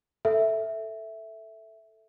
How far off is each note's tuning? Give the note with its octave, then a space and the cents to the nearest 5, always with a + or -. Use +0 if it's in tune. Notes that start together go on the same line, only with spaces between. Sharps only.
A4 +0 E5 +0